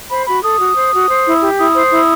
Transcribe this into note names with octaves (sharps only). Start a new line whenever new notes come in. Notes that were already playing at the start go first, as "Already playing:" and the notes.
C5 B5
F#4 B5
A4 D#6
F#4
C5
F#4
C5
E4
G4
E4 D#6
C5
E4